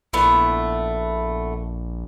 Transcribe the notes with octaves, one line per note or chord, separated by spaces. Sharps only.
A#1 A3 B3 E4